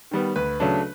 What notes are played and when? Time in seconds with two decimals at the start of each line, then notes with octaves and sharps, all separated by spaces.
0.11 D#3 G3 B3
0.36 D2 B4
0.60 C#3 F#3 A3 D4